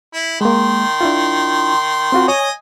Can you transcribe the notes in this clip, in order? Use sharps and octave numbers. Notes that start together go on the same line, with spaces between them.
E4
D#3 G#3 A#3 C6
D4 E4 F4
C4 F4 F#4
C#5 D#5 G#5 D#6